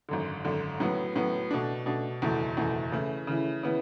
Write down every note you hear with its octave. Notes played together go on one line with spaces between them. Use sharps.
G#1 F#2 D3
G#1 F#2 D3
A2 F#3 B3
A2 F#3 B3
B2 A3 D4
B2 A3 D4
F#1 E2 B2 A3 E4
F#1 E2 B2 A3 E4
C#3 E3 A3 E4
C#3 E3 A3 E4
C#3 E3 B3 E4